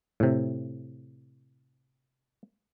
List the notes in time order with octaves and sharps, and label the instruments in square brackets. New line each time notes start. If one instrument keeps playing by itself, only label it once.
[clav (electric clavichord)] A2 C3